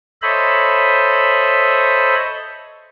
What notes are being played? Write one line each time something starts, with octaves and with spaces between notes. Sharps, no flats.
A4 C5 C#5 D#5 E5 B5